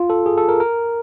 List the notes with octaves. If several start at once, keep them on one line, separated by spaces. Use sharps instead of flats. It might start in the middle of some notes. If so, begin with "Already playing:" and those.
Already playing: F4
A4
G#4
A4
A#4
A#4